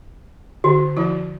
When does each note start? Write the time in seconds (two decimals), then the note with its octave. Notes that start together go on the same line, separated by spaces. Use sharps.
0.64 D3 F#4
0.97 F3 E4